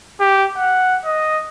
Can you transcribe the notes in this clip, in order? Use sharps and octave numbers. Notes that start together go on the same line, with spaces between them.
G4
F#5
D#5